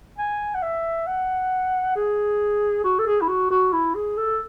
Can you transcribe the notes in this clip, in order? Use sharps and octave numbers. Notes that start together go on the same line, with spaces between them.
G#5
F#5
E5
F#5
G#4
F#4
A4
G#4
E4
F#4
F#4
E4
G#4
A4